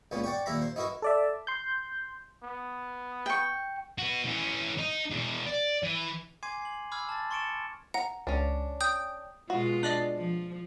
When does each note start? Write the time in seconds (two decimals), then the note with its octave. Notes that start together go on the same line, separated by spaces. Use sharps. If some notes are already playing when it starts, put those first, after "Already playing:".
0.11 C#2 A#2 B3 C#4 F4
0.24 D5 F#5 G5 C#6
0.46 D#2 A#2 E5 A#5 B5
0.62 C5
0.76 D#4 E4 F#4 A#4 B4
1.02 A4 D5 E5
1.47 C6 G6
2.43 B3
3.26 G5 C#6
3.98 F#4 B4
4.26 E3 C#4
4.78 D#4
5.11 E2 B2
5.47 D5
5.83 E3
6.43 G#5 C6 D6 G#6 C7 D#7
6.62 C7 F#7
6.92 B5 D6 E6 F6 G#6
7.09 A5 A6
7.31 C6 C#6 A6 C#7 D7 E7
7.94 F#5 A#5
8.27 C#2 C#4 D4
8.81 G5 D#6 G6
9.50 B2 G#3 F4 F#4
9.83 D4 D5 D#5
10.18 F3